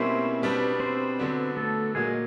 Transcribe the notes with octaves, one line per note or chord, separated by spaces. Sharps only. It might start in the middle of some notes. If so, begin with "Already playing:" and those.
Already playing: B2 G3 A#3 C4 C#4 E4 C5
B2 G3 B3 D4
C4 C5
D3 F#3 B3 D4
A3 A4
A#2 F#3 G#3 A#3 G#4